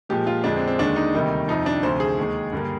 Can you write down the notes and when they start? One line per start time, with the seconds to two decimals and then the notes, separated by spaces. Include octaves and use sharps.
0.09 A#2 F3 G#3 G4
0.27 F4
0.44 F2 D3 F3 G#3 D4
0.56 C4
0.68 C4
0.79 D#2 D3 G#3 D4
0.96 D#4
1.14 D2 C3 D#3 G3 A#3
1.48 F2 C3 F3 D#4
1.66 D4
1.83 D2 C3 F3 C5
2.00 G#4
2.18 D#2 D#3 G#3
2.52 G2 D3 G3 A#3